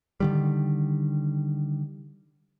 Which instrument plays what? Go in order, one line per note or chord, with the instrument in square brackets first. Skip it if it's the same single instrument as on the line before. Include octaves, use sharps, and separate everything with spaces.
[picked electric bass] D3 D#3 G3